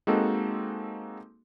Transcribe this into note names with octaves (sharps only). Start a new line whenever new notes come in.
G#3 A#3 C4 D#4 F#4 A4